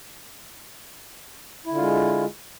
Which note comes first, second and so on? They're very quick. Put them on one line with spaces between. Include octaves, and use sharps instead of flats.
E4 D3 F4 G#3